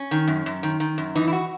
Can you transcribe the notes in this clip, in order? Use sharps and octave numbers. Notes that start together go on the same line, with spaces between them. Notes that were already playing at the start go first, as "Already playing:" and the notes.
Already playing: C#4
D#3
F#2
F#2
D#3
D#3
F#2
E3 D#4
E4
F#4